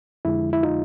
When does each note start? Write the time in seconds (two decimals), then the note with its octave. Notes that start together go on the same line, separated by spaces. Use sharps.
0.25 F2 D3 F3 G#3 E4
0.53 E4
0.63 D#4 F4